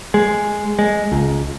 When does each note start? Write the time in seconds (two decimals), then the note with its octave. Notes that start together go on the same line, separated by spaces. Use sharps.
0.14 G#3
0.79 G#3
1.12 C#2